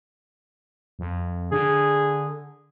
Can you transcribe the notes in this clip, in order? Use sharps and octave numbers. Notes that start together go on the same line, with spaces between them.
F2
D3 G#4